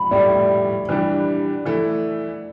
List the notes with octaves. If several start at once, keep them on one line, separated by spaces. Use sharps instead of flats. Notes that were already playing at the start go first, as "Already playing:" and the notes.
Already playing: B5
A2 G3 E4 D5
E3 G3 D4 G4
E3 A3 E4